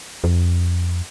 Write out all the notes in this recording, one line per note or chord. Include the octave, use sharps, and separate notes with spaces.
F2